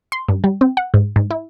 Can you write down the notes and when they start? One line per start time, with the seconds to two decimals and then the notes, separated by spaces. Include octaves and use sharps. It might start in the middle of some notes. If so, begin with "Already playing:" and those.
0.12 C6
0.28 G2
0.44 G3
0.61 C4
0.77 F#5
0.94 G#2
1.16 G#2
1.31 E4